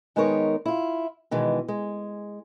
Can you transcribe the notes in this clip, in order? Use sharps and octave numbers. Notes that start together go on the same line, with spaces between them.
D#3 G#3 B3 D#4 A#4 C#5
E4 F4
B2 D#3 E3 G#3
G#3